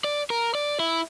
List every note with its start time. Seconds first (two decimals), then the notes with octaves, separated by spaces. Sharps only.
0.04 D5
0.30 A#4
0.55 D5
0.80 E4